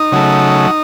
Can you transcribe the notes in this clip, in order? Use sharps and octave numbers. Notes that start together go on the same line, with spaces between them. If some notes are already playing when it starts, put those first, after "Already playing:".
Already playing: D#4
C#3 F#3 A3